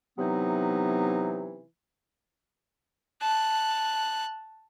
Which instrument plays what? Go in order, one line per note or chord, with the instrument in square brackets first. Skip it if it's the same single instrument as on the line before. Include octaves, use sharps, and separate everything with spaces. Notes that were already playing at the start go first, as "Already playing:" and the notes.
[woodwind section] C3 E3 F#3 B3 D#4
[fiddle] A5 F#6